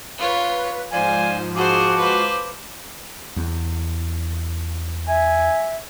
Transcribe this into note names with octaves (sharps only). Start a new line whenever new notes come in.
F4 B4 C#5
G#2 F3 C5 D5 F5 G#5
F#4 G#4 C5 F5 A5 D6
B4 C5
E2
E5 G#5